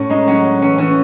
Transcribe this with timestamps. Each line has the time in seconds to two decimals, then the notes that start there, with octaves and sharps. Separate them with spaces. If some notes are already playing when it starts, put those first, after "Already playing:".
Already playing: A2 C#4
0.10 G#3 D#4
0.27 F#3 C#4
0.45 F#3
0.62 E3 C#4
0.78 E3 C#4